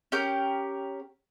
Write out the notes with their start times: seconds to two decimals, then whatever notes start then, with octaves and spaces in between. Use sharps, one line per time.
0.12 C#4 G4 A#4 G6